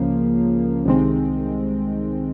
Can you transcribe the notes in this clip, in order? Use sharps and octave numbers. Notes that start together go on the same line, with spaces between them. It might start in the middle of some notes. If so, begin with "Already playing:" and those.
Already playing: C#2 C#3 F3 A#3
C2 C3 D#3 G#3 C4